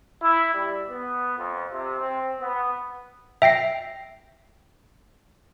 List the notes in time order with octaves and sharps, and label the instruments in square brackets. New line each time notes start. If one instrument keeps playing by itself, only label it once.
[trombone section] E4
G3
B3
F2
C3
C4
B3
[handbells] E5 G5 A#6 C7